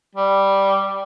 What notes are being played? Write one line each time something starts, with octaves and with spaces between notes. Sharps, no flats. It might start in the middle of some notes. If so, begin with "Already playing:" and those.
G3